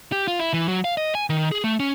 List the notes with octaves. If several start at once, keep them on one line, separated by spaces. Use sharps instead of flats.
G4
F4
E4
E3
F#3
F5
D#5
G#5
D#3
G#4
A3
C#4